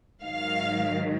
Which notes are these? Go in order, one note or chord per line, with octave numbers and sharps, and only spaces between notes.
G#2 D#3 F#3 F5